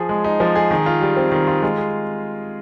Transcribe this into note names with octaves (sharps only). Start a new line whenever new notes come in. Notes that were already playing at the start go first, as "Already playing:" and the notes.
Already playing: F3 G#4
G#3
D#4
F3
G#4
D#3
F4
G3
C4
D#3
F4
G#3
G#4